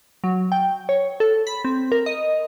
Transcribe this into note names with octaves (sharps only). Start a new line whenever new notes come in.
F#3
G5
C#5
A4
B5
C4
A#4
D#5